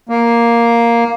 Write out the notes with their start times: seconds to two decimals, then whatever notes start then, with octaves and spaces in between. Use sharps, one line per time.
0.09 A#3